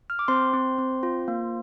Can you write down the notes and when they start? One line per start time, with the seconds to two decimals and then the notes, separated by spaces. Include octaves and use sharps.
0.10 F6
0.19 D6
0.28 C4 C5 C6
0.53 C4
0.78 C4
1.03 F4
1.28 A#3